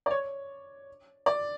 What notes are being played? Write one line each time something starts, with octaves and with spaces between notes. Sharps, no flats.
D5
C#5
D5